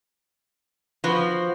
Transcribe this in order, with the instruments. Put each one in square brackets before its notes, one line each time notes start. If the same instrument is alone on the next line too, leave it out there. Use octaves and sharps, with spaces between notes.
[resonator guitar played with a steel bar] F3 [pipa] B3 F#4